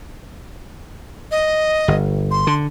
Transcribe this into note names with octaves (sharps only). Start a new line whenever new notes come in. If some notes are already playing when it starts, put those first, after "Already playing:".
D#5
G1
C6
D3